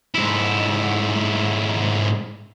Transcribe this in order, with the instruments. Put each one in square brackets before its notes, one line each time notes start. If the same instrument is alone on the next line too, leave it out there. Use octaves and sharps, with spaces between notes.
[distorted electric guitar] G#2 E4